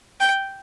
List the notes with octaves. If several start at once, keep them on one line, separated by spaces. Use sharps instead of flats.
G5